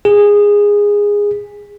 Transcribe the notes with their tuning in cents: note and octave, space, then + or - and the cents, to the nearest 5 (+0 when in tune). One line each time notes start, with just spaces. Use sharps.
G#4 -15